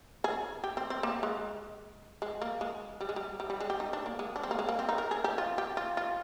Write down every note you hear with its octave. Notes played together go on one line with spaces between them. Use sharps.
G#4
G4
C4
C4
A#3
G#3
G#3
A#3
G#3
G3
G#3
G3
G3
G3
G#3
G4
D#4
D4
A#3
G#3
D4
C4
A#3
G#3
A#3
C4
D#4
A#4
G#4
G4
F4
G4
F4
F4